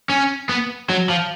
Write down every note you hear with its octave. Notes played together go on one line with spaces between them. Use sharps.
C#4
B3
F#3
F3